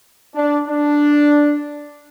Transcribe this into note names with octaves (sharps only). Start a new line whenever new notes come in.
D4
D4